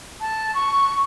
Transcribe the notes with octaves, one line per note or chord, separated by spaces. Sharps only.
A5
C#6